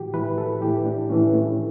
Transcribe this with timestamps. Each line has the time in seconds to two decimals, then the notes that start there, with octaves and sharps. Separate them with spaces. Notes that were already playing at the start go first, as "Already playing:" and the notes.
Already playing: A2 E3 F#4 G4
0.14 A2 E3 B4
0.38 A4
0.61 A2 E3 G4
0.86 D4
1.09 A2 E3 C#4
1.34 A3